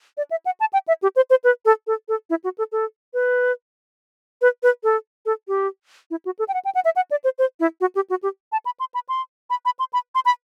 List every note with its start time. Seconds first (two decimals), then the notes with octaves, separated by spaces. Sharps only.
0.17 D5
0.31 E5
0.46 F#5
0.60 A5
0.73 G5
0.88 E5
1.03 G4
1.16 C5
1.30 C5
1.44 B4
1.65 A4
1.87 A4
2.09 A4
2.30 E4
2.44 F#4
2.58 A4
2.72 A4
3.14 B4
4.42 B4
4.63 B4
4.84 A4
5.26 A4
5.48 G4
6.11 E4
6.25 F#4
6.39 A4
6.48 G5
6.54 F#5
6.65 G5
6.75 F#5
6.85 E5
6.96 F#5
7.11 D5
7.24 C5
7.39 C5
7.60 E4
7.81 F#4
7.95 G4
8.10 F#4
8.23 G4
8.52 A5
8.66 B5
8.80 C6
8.94 B5
9.09 C6
9.50 B5
9.65 B5
9.79 C6
9.93 B5
10.15 C6
10.25 B5